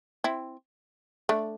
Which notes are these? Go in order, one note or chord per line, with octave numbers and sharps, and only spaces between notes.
C4 E4
A3 D4